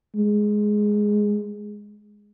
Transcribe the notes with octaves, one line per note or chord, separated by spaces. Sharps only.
G#3